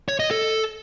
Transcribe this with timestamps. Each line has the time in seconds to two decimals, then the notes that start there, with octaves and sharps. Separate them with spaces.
0.09 C#5
0.20 D#5
0.31 A4